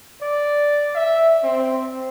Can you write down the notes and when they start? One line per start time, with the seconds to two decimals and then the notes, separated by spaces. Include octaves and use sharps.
0.20 D5
0.95 E5
1.42 C4